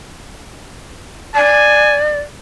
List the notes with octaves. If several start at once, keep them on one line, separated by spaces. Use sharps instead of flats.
D5 G#5